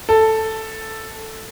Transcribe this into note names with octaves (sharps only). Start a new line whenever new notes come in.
A4